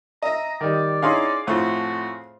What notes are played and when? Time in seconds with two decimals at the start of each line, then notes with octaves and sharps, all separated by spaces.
0.22 D#5 E5 A#5
0.61 D#3 G3 D5
1.02 C#4 D#4 E4 G#4 F5 C6
1.47 F2 A2 A3 F#4